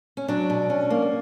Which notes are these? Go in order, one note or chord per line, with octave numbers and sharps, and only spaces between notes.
C#4
F#3 D4
B2
C#4
A#3